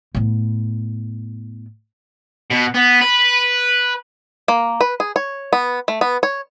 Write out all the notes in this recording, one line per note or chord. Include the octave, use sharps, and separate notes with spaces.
A2 B3
B2
B3
B4
A#3
B4
G#4
C#5
B3
A3
B3
C#5